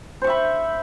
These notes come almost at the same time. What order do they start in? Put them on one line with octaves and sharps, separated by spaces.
C5 C#6 E5 B5